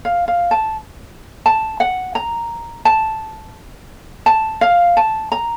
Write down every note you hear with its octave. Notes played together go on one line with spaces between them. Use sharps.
F5
F5
A5
A5
F#5
A#5
A5
A5
F5
A5
A#5